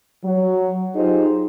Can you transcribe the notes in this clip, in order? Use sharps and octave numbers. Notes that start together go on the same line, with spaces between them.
F#3
D#4 F4 G4 G#4 C5